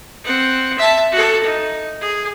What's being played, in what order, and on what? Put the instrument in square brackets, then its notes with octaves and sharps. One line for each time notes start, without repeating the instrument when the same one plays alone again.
[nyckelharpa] C4 F#5
E5 A5
F#4 A4
D#4
G#4